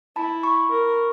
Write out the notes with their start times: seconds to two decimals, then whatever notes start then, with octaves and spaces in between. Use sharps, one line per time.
0.16 E4 A5 B5
0.43 B5 C#6
0.71 A#4